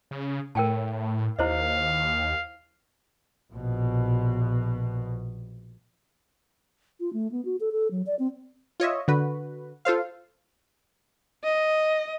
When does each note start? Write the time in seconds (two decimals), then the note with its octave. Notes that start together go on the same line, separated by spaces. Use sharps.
0.11 C#3
0.55 A2 A#4 G5 A5
1.39 D#2 E4 C5 D#5 F5
3.52 A#1 B2
7.00 F4
7.13 A3
7.31 B3
7.45 F#4
7.60 A4
7.72 A4
7.91 F#3
8.06 D5
8.19 C4
8.80 F4 C#5 D#5 E5
9.08 D3 F#4 B4
9.85 F4 A4 C5 F5
11.44 D#5